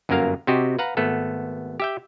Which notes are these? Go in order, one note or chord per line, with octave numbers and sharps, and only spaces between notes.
G1 F#2 F#3 A#3 A#4 F5
C3 C4 F#4 G4 D#5
B4 F5 F#5 A#5
G#1 A3 B3 A4
G4 E5 G5